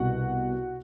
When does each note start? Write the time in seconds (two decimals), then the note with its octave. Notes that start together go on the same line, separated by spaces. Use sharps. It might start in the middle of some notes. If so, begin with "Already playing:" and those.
Already playing: C2 B2 F#4 F#5